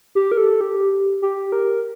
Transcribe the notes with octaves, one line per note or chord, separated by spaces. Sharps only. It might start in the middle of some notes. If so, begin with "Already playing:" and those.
G4
A#4
A4
G4
G4
A#4